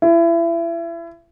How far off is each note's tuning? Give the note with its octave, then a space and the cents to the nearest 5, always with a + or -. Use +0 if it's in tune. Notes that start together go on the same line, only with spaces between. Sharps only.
E4 +30